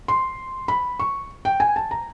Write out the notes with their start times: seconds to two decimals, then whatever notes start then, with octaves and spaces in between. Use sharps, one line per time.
0.08 C6
0.68 B5
0.99 C#6
1.45 G5
1.60 G#5
1.76 A5
1.91 A#5